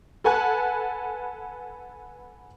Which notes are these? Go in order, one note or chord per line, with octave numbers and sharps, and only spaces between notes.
A4 B4 F#5 G#5 A5 F#6